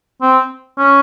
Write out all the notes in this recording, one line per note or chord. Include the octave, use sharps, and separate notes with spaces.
C4
C#4